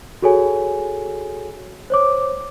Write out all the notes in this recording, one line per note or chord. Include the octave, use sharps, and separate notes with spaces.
F#4 G#4 A4 C#5 G#5
C5 C#5 D6